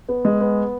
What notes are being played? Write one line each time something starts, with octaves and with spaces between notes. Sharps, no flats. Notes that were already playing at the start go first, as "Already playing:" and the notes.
B3
G#3
B3